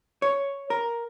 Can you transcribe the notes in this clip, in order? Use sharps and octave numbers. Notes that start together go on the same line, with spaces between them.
C#5
A#4